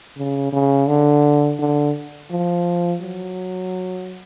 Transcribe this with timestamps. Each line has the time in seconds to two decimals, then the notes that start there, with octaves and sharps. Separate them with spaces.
0.17 C#3
0.52 C#3
0.88 D3
1.59 D3
2.31 F3
3.01 F#3